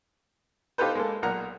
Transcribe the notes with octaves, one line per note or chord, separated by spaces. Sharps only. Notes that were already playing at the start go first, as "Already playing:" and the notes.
D#4 F4 G4 A4 B4 C5
G#3 A#3 A4
B1 A#2 A#4 F#5 A#5